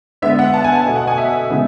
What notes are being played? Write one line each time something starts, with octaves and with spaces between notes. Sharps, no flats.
D3 G#3 B3 E5
F#5
A5
G#5
A5
B2 A3
F#5
G#5
E5
C#3 E3 G#3 B3